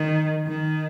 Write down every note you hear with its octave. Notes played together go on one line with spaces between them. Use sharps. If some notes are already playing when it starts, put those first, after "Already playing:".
Already playing: D#3
D#3